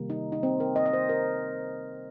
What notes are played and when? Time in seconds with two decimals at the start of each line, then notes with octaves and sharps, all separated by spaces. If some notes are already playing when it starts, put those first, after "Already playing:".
Already playing: C3 D#3 G3 A#3
0.10 D#4
0.32 D#4
0.43 C4
0.60 A#4
0.76 D#5
0.86 D#5
0.93 C5
1.09 A#4